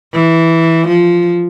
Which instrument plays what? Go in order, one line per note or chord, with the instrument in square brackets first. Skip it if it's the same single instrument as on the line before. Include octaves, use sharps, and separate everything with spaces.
[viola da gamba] E3
F3